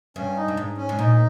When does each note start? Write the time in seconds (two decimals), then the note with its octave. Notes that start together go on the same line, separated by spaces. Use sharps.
0.16 G2 C#4
0.37 D#4
0.48 G2
0.57 G#2
0.77 C#4
0.89 G#2
0.99 A#2 D#4